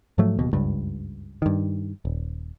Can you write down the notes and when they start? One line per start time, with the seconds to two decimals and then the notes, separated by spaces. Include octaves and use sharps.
0.18 G#2 F3 F#3 A3
0.39 D1 D#2 B2
0.53 F#1 C#2 G2
1.42 G2 D#3
2.05 D#1